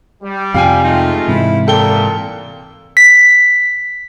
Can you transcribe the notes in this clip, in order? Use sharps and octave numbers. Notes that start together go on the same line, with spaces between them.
G3
F2 C3 F3 G4 F5 G5 G#5
G#3 A3 D#4 F4
G#2 C3 E3 E4
A#2 A4 G5 G7
B6